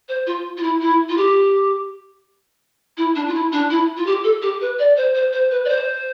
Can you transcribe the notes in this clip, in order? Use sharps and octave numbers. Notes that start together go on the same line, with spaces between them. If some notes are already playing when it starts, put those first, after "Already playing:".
C5
F4
F4
E4
E4
F4
G4
E4
D4
F4
E4
D4
E4
F4
G4
A4
G4
B4
D5
C5
C5
C5
B4
D5
C5